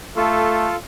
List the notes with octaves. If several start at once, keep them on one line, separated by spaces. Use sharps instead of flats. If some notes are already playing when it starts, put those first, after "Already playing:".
A3 F4 A4